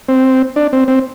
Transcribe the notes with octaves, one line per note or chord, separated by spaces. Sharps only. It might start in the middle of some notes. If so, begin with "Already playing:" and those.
C4
D4
C4
C4